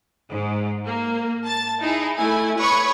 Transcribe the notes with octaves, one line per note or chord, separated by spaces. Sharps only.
G#2
A#3
A5 A6
D#4 E4 G#4
A3 E4 G#5
B4 C#5 B5 C#6 D#6